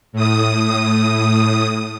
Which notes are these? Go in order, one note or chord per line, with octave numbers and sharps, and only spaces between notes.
A2 D#6